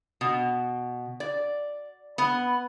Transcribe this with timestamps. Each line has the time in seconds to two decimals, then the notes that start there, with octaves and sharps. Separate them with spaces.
0.21 B2
1.20 D5
2.18 B3